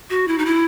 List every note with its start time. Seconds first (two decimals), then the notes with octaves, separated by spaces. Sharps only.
0.10 F#4
0.28 E4
0.38 D#4
0.46 E4